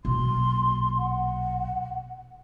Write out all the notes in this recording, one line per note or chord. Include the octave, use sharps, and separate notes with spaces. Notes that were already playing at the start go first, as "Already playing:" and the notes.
B1 A#2 C6
F#5